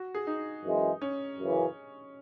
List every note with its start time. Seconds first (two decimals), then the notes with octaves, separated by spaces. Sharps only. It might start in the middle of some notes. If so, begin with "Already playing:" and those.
Already playing: F#4
0.15 G#4
0.27 D#4
0.65 F#2 E3 G#3
1.02 C#4
1.38 F#2 C#3 E3